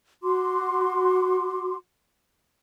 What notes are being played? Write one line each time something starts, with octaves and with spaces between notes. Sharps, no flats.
F#4 C6 D6